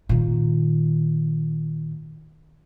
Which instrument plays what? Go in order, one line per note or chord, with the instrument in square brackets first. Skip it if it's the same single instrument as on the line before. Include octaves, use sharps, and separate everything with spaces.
[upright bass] A#2 D#3